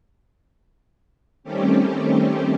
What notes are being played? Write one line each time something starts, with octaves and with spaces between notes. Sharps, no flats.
D#3 G3 A3 C4 C#4 G4